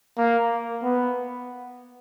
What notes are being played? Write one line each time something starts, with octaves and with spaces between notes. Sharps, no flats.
A#3
B3